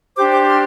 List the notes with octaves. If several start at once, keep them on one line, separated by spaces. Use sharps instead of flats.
D4 G4 C5 D6 G6
D6 G6
C6 F6